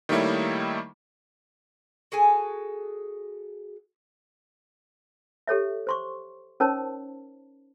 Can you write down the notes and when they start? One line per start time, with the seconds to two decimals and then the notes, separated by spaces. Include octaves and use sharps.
0.09 D#3 G3 A3 A#3 E4 C#5
2.12 F#4 G#4 A4 G#5
5.47 G4 A4 C#5 E5
5.87 C5 C6 C#6
6.60 C#4 D#4 A#4 C5 C#5 A5